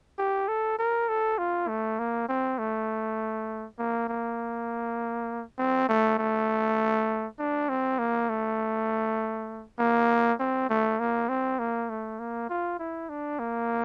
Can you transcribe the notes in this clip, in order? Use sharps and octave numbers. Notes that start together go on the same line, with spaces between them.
G4
A4
A#4
A4
F4
A3
A#3
C4
A3
A#3
A#3
C4
A3
A3
D4
C4
A#3
A3
A#3
C4
A3
A#3
C4
A#3
A3
A#3
F4
E4
D4
A#3